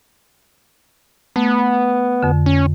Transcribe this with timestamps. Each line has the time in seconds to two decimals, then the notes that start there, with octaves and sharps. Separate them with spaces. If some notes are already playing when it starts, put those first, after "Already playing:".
1.36 A3 B3
2.23 F2 D3
2.46 C#4